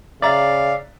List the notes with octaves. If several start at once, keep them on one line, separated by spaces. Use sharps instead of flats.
C#3 D5 E5 F5 A#5 A6